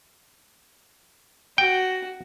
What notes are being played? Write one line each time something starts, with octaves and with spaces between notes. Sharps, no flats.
F#4 G5